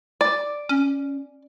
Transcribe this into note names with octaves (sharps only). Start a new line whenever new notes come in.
D5
C#4